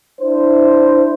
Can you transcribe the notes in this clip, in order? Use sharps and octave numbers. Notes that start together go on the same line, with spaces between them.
D4 E4 C5